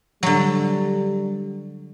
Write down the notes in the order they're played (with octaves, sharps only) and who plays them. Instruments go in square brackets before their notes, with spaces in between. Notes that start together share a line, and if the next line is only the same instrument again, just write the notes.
[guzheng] D3 F#3 [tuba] G3